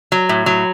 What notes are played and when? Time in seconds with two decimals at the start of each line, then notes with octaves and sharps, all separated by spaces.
0.12 F#3
0.29 A2
0.46 F#3